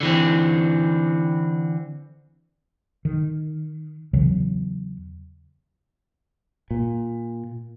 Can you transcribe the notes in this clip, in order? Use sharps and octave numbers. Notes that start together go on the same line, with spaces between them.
D3 E3 C4
D#3
E2 C#3 E3 F#3
A#2